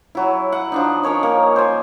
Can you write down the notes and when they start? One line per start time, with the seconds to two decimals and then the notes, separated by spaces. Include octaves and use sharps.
0.15 F#3 E4
0.52 F#5
0.72 F3 D4 D#4
1.03 C#4 A#4 C#5 D#5
1.23 A#3
1.56 C5 G#5